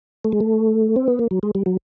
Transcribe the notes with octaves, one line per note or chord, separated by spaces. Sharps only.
A3
G#3
A3
C4
B3
A#3
F#3
G#3
G3
F#3